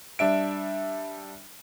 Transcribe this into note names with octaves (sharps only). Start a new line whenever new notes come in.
G3 D4 E5 D7